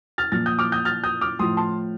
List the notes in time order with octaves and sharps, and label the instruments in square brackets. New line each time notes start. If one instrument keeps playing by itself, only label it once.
[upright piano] F6 A6
A#2 F3 F6 A6
D#6 G6
D6 F6
D#6 G6
F6 A6
D#6 G6
D6 F6
A2 F3 C6 D#6
A5 C6